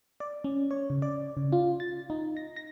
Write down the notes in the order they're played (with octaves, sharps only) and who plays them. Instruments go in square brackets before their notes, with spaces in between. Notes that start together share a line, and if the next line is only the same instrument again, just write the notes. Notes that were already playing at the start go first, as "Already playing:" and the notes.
[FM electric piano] D5
C#4
C#5
C#3
D5
C#3
F4
A6
D#4
A#6
A#6